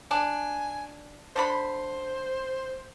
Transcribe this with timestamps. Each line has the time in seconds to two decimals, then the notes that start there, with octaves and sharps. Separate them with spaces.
0.11 D4 G#5
1.36 D3 D4 C5 B5